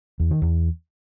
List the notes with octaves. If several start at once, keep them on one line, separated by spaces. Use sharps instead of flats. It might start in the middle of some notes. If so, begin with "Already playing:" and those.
E2
D#3
E2